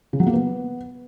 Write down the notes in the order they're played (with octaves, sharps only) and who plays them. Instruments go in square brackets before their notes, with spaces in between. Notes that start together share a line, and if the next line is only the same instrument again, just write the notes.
[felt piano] C#3
F#3
A#3
B3